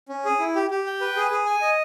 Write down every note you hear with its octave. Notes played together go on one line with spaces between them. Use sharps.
C#4
G#4
E4
G4
G4
G5
B4
G#4
G#4
G#5
D#5